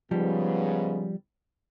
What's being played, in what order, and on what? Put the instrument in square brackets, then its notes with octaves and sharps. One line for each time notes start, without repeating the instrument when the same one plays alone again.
[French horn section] G#2 C#3 B3 [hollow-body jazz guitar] F3 G3